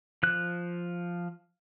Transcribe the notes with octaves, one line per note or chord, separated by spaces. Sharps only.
F3 F#6